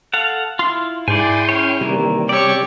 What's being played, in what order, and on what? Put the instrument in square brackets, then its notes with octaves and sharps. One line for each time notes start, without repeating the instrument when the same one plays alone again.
[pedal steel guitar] A4 F5 F#5
[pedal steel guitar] E4 F4 [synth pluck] C6
[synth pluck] G#2 [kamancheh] E4 G#4 [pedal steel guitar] D5 G#5 [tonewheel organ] G5 C6
[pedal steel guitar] C#4 C#5
[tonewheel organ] C3 G3 [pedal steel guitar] D#3 E3 A#3
[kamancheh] G4 C#5 [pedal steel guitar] D5 E6